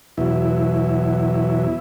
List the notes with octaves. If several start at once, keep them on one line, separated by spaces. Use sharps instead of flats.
E2 B2 F#3 E4